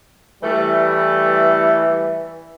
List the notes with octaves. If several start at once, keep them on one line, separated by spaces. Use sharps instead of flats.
E3 G3 A3